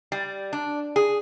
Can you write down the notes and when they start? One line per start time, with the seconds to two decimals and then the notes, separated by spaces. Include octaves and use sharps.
0.12 G3
0.53 D4
0.96 G#4